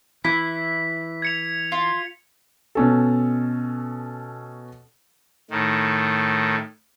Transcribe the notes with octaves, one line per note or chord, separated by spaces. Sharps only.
E3 E4 B6
G#6 C#7 F7
F4
B2 C#4 A4
A2 D#3